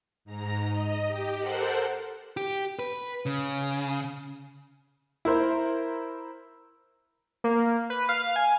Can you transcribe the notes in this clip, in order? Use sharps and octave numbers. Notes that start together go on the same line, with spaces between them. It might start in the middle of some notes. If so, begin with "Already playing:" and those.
G#2 A#5
D#5
G4
A4 A#4 C5 F#5 F#6
G4
B4
C#3
E4 A#4 C5
A#3
B4
F5
G#5